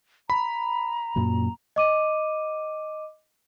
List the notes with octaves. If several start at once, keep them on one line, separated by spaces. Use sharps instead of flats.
A#5 B5
F#2 A#2 F#3
D#5 D6 D#7